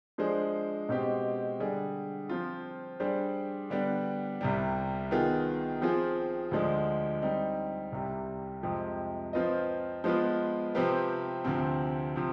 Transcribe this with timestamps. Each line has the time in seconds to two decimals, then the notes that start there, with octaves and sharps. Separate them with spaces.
0.18 F3 G#3 D4 G#4 C5
0.89 B2 G#3 C4 G4
1.60 D3 G3 D4 G#4
2.29 F3 C4 F4
3.00 G3 D4 G#4 C5
3.70 D3 G3 B3 D4
4.41 C2 C3 G3
5.11 D#3 B3 F4 G#4
5.81 F3 C4 F4 G#4
6.51 D2 D3 F3 G#3 D4
7.22 G3 C4 D#4
7.92 C2 C3 G3
8.63 F2 C3 F3 G#3
9.33 F3 C4 F4 B4 D#5
10.04 F3 G#3 B3 F4 B4
10.75 C3 F3 C4 G4 B4
11.44 D2 C3 F3 C4
12.16 C3 F3